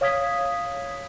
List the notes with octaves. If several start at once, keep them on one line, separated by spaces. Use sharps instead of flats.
C#5 F5 D#6 G#6 B6